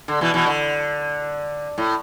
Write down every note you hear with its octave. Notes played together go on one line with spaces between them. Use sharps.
D3
B2 E3
B2 E3
D3
A2